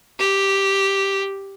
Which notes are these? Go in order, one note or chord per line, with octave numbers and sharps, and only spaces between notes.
G4